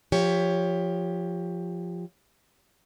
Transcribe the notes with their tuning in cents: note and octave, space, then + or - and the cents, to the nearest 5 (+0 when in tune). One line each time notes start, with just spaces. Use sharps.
F3 +0 G4 +15 C#5 +15